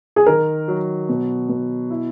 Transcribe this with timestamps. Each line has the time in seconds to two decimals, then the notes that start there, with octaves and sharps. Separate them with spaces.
0.16 G#4
0.26 D#3 A#4
0.68 F#3
1.09 B2
1.49 B2
1.90 E4